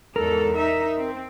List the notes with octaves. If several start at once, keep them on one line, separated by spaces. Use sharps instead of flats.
E2 G#2 A4 A#4
D#4 E5
C4